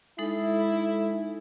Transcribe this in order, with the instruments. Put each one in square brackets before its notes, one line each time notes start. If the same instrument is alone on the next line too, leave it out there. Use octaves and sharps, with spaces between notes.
[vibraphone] G#3 D#4 A4 [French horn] E4